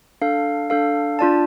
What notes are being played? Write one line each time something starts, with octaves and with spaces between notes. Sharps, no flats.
D4 A4 F5
D4 A4 F5
D4 F4 D5 A5